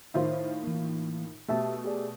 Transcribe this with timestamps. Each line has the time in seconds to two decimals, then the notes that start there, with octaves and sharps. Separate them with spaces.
0.14 A2 D#3 F4 C5 E5
0.64 E3 A#3
1.48 B2 A3 G4 E5 A5
1.84 G4 G#4 D5